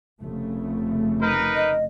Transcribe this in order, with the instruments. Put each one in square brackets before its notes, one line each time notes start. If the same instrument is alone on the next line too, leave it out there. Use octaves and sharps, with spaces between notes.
[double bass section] F1 C#3 A3
[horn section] D#4 A#4 B4
[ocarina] D#5